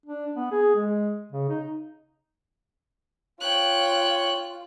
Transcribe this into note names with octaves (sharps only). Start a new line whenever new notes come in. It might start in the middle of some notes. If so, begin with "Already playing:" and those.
D4
B3
G#4
G#3
C#3
D#4
F4 C#5 G5 F#6